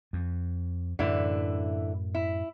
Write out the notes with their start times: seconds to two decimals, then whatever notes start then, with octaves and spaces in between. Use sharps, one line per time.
0.13 F2
0.99 F#2 A2 D3 E3 E4
2.15 E4